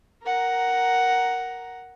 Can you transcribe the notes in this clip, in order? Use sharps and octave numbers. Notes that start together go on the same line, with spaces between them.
A#4 F#5 A#5